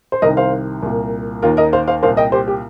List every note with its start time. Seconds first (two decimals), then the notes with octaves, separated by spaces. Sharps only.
0.12 C5
0.22 C2 A#4 D#5
0.25 C3 D#3
0.37 C5 F5
0.83 C2 A#2
1.42 D#2 D#3 F4 A#4
1.57 A#4 D#5
1.73 C5 F5
1.88 C5 F5
2.03 C2 A#2 C5 F5
2.17 D#5 G5
2.32 G4 C5
2.47 G4